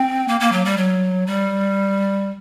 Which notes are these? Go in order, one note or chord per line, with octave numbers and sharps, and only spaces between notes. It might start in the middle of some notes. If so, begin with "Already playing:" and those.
Already playing: C4
A#3
A#3
F#3
G3
F#3
G3